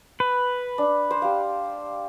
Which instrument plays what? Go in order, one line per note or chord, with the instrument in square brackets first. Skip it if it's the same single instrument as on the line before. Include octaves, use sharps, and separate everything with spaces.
[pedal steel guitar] B4
[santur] D4
C5
G4 F5